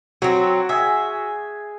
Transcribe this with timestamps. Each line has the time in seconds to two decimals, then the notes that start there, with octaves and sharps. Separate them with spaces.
0.22 F#3 C4 F#4
0.69 G#4 E5 G#5